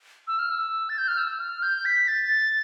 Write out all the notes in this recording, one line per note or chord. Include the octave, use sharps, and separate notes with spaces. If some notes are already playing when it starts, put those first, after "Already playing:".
E6
F6
E6
A6
G6
F6
E6
F6
G6
B6
A6